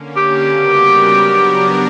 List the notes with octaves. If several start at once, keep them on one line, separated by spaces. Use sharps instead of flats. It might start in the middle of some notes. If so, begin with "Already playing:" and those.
Already playing: D3 A#3 C#4
G4
C#3 G3 B3 F#4 A#4
F#3 B3 D4 A#4